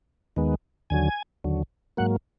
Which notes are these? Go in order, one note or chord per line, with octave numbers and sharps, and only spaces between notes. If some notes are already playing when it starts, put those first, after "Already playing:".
D#2 D#3 G#3 B3
D#2 D3 F#3 G#5
D#2 D3 F#3
G#2 F#3 A#3 F#5